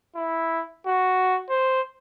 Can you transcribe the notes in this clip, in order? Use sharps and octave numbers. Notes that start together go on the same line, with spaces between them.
E4
F#4
C5